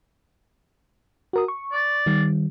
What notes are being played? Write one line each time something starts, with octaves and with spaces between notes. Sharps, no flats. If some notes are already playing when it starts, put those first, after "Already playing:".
F#4 A#4 D#6
C#6
D5
D#3 G3